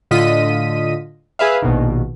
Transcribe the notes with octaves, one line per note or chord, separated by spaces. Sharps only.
A2 D3 F4 D#5 B6 D#7
G#4 B4 E5 F5
A#1 B2 D#3